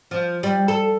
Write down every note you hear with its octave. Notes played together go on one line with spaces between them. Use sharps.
F3
G3
A4